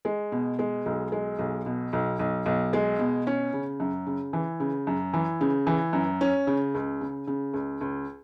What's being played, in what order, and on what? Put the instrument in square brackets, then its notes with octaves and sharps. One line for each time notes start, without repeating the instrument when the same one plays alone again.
[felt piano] G#3
B2
G#3
B1
G#3
B1
B2
B1
B1
B1
G#3
B2
C#4
C#3
F#2
C#3
E3
C#3
F#2
E3
C#3
E3
F#2
C#4
C#3
C#2
C#3
C#3
C#2
C#2